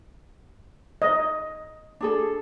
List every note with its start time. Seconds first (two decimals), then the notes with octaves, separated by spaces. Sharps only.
1.02 D#5
2.01 D4 G#4 A4